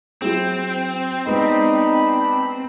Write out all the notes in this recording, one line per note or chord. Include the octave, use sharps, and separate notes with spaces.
F#3 C4 E4 G#4
G#3 B3 D4 D#4 B5